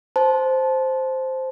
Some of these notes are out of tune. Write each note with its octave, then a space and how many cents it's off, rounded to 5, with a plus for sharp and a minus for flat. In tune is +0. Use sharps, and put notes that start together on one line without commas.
C5 +0 A5 -20